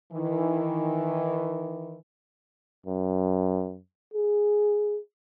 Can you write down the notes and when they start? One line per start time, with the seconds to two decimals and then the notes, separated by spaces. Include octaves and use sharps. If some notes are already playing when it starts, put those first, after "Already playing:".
0.12 D#3 E3
2.86 F#2
4.14 G#4